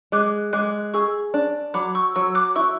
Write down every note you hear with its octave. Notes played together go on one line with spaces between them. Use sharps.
G#3 D6 F#6
G#3 D6 F#6
G#4 C#6 E6
D4
F#3 B5 D6
C#6 E6
F#3 C#6 E6
D6 F#6
E4 C#6 E6